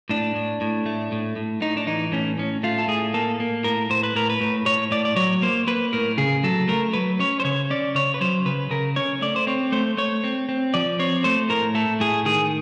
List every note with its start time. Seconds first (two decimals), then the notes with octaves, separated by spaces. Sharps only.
0.09 A2 D4
0.35 A2
0.61 A2
0.86 A3
1.12 A2
1.36 A2
1.62 A2 D#4
1.77 D4
1.87 E3 D#4
2.12 A2 C#4
2.38 A2 C#4
2.63 A3 F4
2.78 A4
2.88 A2 G#4
3.14 A#3 A4
3.40 A#3
3.64 A2 A#4
3.90 A2 C5
4.03 B4
4.15 A2 A#4
4.30 B4
4.41 A2
4.66 A2 C#5
4.91 A2 D5
5.05 D5
5.16 F#3 C#5
5.42 A#3 C5
5.67 A#3 B4
5.93 A2 A#4
6.18 C#3 G#4
6.44 F#3 A4
6.68 A3 A#4
6.93 F#3 B4
7.19 C#4 C#5
7.40 C5
7.44 C#3 C#5
7.70 C#4 D5
7.95 C#3 C#5
8.14 B4
8.21 F#3 C5
8.45 C#3 B4
8.70 C#3 A#4
8.96 C#4 C#5
9.21 A3 D5
9.36 C5
9.47 C4 C#5
9.72 A3 C5
9.97 A3 C#5
10.24 C4
10.49 C4
10.74 F3 D5
10.99 C4 C#5
11.24 A3 C5
11.49 A2 A#4
11.75 A3 A4
12.00 A2 G#4
12.25 D#3 G#4